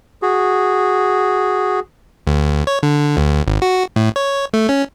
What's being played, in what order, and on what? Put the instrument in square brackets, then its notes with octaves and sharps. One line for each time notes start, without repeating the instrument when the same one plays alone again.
[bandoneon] F#4 G#4
[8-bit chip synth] D2
C#5
D3
D2
G#1
F#4
A2
C#5
A3
C#4